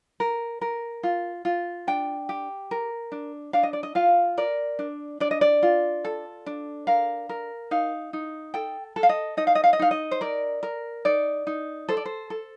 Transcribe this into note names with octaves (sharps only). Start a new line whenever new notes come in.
A#4
A#4
F4
F4
D4 G5
G4
A#4
D4
D4 F5
D#5
D5
D#5
F4 F5
A#4 D5
D4
D4 D5
D#5
D5
F4
A4
D4
A#4 F5
A#4
D#4 F5
D#4
A4 G5
A4
F5
D#5
D#4 D#5
F5
D#5
F5
D#5
D#4 F5
D#5
C5
A#4 D5
A#4
D#4 D5
D#4
A4 C5
D5
C5
A4